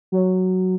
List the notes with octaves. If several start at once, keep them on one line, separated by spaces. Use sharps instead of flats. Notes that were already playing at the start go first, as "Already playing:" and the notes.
F#3